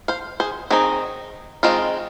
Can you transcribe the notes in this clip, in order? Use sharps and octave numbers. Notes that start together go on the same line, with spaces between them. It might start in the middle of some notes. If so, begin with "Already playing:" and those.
C5 F5
G#4 C5
D#3 C4 D#4 G#4
D#3 G#3 C4 D#4 F4